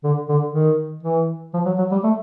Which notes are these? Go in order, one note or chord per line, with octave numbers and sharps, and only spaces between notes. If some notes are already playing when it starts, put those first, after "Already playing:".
D3
D3
D#3
E3
F3
F#3
F#3
G3
A3